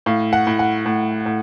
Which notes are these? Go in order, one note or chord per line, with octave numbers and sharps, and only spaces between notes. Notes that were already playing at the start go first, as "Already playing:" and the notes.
A2 F5
F#5
A2
F#5
A2
A2